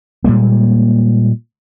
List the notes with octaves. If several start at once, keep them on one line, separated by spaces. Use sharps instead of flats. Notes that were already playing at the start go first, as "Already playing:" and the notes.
A#2 G3 G#3 A#3